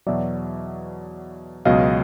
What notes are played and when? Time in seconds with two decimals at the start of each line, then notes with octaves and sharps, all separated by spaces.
0.06 E2 B2 F#3 D5 E5
1.65 C#2 B2 F#3 D#5 F5